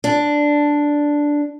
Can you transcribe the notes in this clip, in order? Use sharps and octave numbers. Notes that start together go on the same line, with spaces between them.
D4